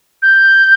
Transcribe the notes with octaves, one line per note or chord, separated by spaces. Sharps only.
G6